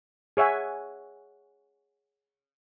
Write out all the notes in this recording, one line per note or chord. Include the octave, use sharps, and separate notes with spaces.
G#4 C#5 E5 F#5 G#5